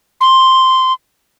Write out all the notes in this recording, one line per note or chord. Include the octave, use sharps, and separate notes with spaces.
C6